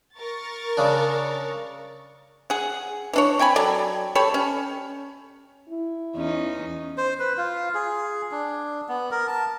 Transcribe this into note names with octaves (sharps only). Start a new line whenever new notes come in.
A#4 C#6 A6
C#3 D4
G#4 F#5
E3 D4 C#5
C4 G5 G#5 B5
F#3 A4 D5
G4 A4 C#5 B5
C#4
E4
E2 C#4 D#4
C5
B4
F4
G#4
D4
B3
A#4
A5